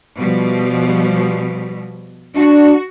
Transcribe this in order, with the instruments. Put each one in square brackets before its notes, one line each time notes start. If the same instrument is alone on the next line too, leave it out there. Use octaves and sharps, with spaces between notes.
[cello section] B2 F3 G3
[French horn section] D4 [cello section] F#4